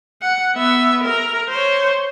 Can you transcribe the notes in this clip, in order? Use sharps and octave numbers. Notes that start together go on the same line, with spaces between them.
F#5
B3 E5
A#4 A#5
C5 C#5